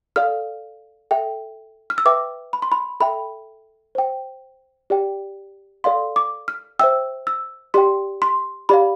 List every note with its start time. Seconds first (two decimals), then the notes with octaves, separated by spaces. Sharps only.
0.16 A4 D5 F5 F6
1.11 A4 E5 G5
1.90 F6
1.98 E6
2.05 B4 E5 G5 D6
2.53 B5
2.62 C6
2.72 B5
3.00 A4 E5 G5 B5
3.95 C5 G5
4.90 G4 D5 G5
5.84 A4 D5 F5 C6
6.16 D6
6.48 F6
6.79 C5 E5 G5 E6
7.27 E6
7.74 G4 D5 G5 C6
8.22 C6
8.69 G4 D5 F5 B5